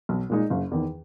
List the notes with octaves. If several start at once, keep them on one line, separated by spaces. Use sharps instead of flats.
B1
A#2 G#3 D#4
F#1
E2 D#3